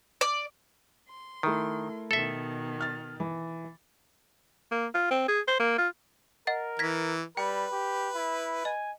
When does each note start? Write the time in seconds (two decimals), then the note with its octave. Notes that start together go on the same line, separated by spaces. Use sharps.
0.21 D5
1.08 C6
1.43 D#3 A3 E4 A#4
2.11 B2 D#3 A4 E5
2.81 F6 A6
3.20 E3
4.71 A#3
4.94 F4
5.11 C4
5.28 G#4
5.48 C5
5.60 A#3
5.78 F4
6.47 A#4 D#5 F#5 A6
6.79 E3 G#6 A#6 B6
7.37 G3 B4 G5
7.72 G4
8.15 E4
8.65 D#5 G#5